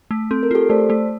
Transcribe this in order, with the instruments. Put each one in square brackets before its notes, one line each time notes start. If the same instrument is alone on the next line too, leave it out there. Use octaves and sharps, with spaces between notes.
[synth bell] A3
[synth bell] C4 [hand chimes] A4
[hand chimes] A#4
[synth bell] F4 [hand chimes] G4 A4
[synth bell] A3 [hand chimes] C5 D5
[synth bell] A3